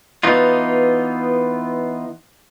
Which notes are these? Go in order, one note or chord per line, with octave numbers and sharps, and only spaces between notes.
E3 B3 D#4 F4